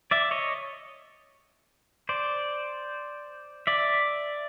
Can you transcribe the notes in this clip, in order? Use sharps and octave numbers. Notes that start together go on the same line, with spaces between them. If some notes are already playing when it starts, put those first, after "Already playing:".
D5 E5
C#5 D#5
C5 D5
D5 E5